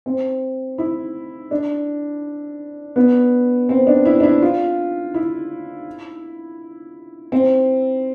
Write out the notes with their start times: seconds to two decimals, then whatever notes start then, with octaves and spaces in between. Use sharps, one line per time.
0.06 C4
0.78 E4
1.51 D4
2.96 B3
3.69 C4
3.87 D4
4.05 E4
4.20 D4
4.23 E4
4.42 F4
5.14 E4
7.32 C4